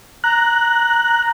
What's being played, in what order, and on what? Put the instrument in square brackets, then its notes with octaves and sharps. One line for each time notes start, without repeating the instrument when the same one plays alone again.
[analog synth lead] A#5 [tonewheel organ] F#6